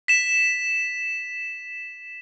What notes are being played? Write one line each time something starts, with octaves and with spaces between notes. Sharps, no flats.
B6 E7